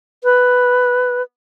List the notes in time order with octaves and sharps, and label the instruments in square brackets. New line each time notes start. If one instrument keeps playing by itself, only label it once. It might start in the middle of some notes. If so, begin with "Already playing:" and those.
[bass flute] B4